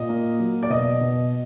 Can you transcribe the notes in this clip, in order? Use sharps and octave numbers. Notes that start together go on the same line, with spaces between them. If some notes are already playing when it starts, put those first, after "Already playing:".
Already playing: A#2 D#5
A#3
F#3
D5
B2 D#5
B2